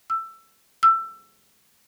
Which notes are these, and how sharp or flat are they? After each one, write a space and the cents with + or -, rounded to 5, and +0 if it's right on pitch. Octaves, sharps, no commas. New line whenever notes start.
E6 +15
E6 +20